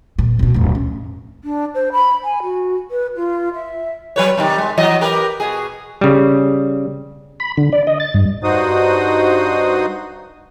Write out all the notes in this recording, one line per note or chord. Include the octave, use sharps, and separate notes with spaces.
E2 A#2
F1 B2
D1 F2
C#4
D4
C5
B5
G#5
F#4
B4
F4
E5
F#3 B4 C#5
C3 D#3 G3
G#3
E3 F#3 D#5
G4 A#4 B4
B2 G#4
C#3 G3
B5
D3
D5
D#5
A6
G2
G2 D#4 F#4 C5 D#6